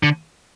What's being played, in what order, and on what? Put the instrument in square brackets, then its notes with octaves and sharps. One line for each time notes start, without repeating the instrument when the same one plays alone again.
[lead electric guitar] D3